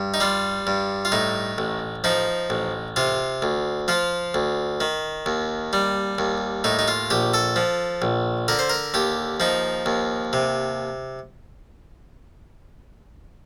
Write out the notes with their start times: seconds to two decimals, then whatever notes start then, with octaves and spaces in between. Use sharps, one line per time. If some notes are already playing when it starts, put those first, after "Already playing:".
Already playing: G2
0.14 D#4
0.20 G3 F4
0.67 G2
1.05 F4
1.12 A2 D#4
1.58 A1
2.04 F3 D#4
2.50 A1
2.96 C3 F4
3.42 D2
3.88 F3 F4
4.34 D2
4.80 D#3
5.26 D#2
5.73 G3
6.18 D#2
6.64 A2 D#4
6.79 D#4
6.88 F4
7.10 A#1 G4
7.34 A4
7.56 F3
8.02 A#1
8.48 D3 A#4
8.59 C5
8.70 A#4
8.94 D#2 G4
9.40 F3 D#4
9.86 D#2
10.33 C3